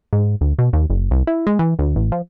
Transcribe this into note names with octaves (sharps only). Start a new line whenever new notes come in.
G#2
D2
B2
D#2
F#1
C2
E4
G#3
E3
D2
A1
F3